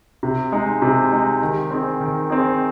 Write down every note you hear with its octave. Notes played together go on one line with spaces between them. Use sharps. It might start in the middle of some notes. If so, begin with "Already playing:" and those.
C3
G#3 D#4
C3
G#3 D#4
D#3
C4 D#4 G#4
D#3
C4 D#4 G#4